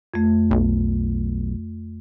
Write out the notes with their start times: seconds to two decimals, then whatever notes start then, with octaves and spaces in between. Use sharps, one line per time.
0.14 F2 A3
0.51 B1